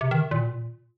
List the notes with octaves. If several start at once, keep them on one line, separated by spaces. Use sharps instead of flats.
C3
D#3
A#2